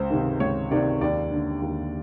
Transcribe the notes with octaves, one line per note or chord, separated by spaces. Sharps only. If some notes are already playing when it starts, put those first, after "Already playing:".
Already playing: C#2 C5
C3 D#3
C#2 C#5
C3 D#3 D5
D#2 D5
D3
D#2